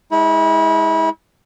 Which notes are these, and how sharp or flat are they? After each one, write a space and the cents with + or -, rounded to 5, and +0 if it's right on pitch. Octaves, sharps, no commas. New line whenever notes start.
G#3 +0 E4 -30